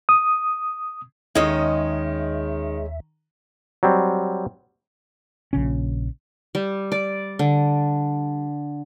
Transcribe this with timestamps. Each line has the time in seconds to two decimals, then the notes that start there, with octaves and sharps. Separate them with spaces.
0.09 D#6
1.35 D#2 D#3 G#3 C#4 D#5 E5
3.83 F#3 G3 C4
5.53 A#1 C#3 C#4
6.55 G3
6.92 D5
7.39 D3